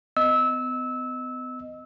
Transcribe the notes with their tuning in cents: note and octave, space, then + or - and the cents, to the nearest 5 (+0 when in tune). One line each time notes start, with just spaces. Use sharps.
B3 +40 D#5 +0 E6 -20